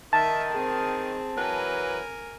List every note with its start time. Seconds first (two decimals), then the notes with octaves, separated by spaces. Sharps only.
0.13 D#3 E5 A5
0.52 C4 G#4
1.37 E3 F#3 A#4 B4 G#5